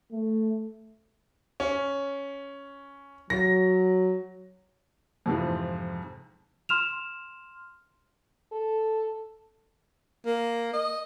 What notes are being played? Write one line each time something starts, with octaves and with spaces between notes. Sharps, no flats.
A3
C#4
F#3 A#6
F2 G#2 C3 E3 F3
C6 F6 E7 F7
A4
A#3
D#5